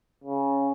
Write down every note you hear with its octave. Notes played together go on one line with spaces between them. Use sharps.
C#3